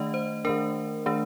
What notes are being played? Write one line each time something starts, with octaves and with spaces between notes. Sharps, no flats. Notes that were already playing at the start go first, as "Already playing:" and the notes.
Already playing: D#3 A3 D4 D#5
C5
D#3 A3 D4 A#4
D#3 A3 D4